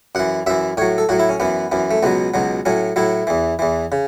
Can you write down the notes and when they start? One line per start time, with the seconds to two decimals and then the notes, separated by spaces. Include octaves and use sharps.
0.15 F#2 E3 F#5
0.47 F#2 E3 E5
0.77 A2 C#5
0.82 F#3
0.98 A4
1.09 A2 F#3 F#4
1.19 E4
1.29 C#4
1.40 F#2 E3 B3
1.72 F#2 E3
1.91 A3
2.03 C#2 B2 F#3 B3
2.34 C#2 B2 F#3
2.65 A2 F#3 C#4
2.96 A2 F#3 E4
3.27 E2 E3
3.59 E2 E3
3.92 C#3